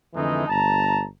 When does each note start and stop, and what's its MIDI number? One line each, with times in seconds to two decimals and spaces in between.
0.15 0.46 41
0.15 0.46 50
0.15 0.46 52
0.15 0.46 56
0.15 0.46 57
0.15 0.46 63
0.48 1.04 31
0.48 1.04 81
0.48 1.04 82